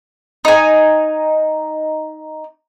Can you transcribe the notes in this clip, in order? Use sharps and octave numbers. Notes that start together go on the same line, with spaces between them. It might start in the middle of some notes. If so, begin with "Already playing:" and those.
D#4 G#5